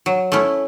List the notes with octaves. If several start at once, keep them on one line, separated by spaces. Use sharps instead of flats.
F#3
A3 C#4 E4